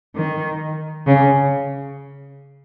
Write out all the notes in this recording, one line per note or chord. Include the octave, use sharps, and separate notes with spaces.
D#3
C#3